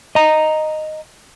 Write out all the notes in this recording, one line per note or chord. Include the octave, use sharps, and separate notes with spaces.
D#5 A#5